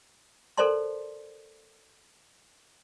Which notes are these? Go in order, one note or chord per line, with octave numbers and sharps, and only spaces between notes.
A4 A#4 C5 D5 A5 C6